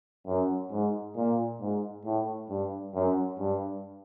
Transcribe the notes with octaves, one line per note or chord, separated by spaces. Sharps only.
F#2
G#2
A#2
G#2
A2
G2
F#2
G2